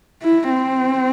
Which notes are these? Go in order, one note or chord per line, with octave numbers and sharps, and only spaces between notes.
E4
C4